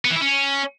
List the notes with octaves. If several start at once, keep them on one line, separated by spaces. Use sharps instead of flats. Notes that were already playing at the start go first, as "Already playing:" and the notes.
B3
E3
E4
C#4